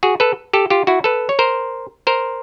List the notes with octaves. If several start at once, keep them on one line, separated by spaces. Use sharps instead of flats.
F#4 G#4
A4 B4
G4 A4
F4 G4
E4 F#4
A4 B4
C#5
A#4 C5
A#4 C5